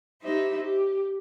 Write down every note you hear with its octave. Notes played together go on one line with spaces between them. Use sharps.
D#4 E4 G4 C5 E5
G4